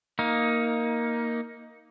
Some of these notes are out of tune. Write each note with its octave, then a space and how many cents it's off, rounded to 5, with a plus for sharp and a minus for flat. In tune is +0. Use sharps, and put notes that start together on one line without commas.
A#3 +0 D#4 +15